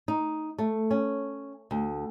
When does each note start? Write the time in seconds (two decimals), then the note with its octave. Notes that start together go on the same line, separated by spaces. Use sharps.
0.08 D#4
0.58 A3
0.91 C#4
1.71 D2